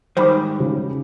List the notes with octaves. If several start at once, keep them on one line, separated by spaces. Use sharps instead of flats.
G#2 D#3 G3 C5 B5 D6
C#3